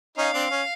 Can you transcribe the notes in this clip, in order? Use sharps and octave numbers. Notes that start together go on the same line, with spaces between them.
C#4 D#4 F5
C4 D4
C#4